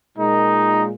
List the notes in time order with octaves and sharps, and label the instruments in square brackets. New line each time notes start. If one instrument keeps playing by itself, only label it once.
[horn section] A#2 G#3 D#4